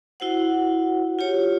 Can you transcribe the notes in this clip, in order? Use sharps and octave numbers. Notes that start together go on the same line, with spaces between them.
E4 F#4 C5 F#5
F4 G4 C#5